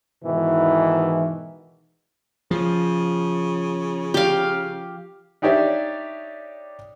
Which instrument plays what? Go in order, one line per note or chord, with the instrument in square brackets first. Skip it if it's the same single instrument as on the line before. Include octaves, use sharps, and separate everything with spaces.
[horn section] G#2 B2 D#3 E3
[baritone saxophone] C#3 [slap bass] F3
[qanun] G4 F5
[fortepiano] D4 D#4 G4 C#5 D5 E5